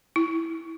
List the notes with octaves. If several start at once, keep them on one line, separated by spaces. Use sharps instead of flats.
E4